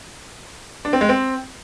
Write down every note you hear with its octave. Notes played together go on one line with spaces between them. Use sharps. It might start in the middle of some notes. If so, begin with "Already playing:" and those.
D4
C4
G#3
C4